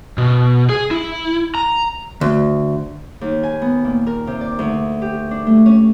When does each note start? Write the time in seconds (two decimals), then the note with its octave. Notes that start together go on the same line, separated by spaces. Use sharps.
0.18 B2
0.69 G#4
0.91 E4
1.55 A#5
2.21 D2
3.21 D#2
3.43 G#5
3.62 B3
3.84 A#2
4.07 A#4
4.27 C3
4.41 D5
4.59 D2
5.02 G4
5.31 D4
5.47 A3
5.66 C#4